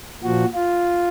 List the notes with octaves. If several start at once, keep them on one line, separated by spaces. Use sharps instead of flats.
A#2 F3 F#4
F4